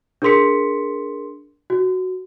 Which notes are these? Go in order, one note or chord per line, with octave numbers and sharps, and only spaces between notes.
D4 G#4 A#4 C6 B6 C#7
F#4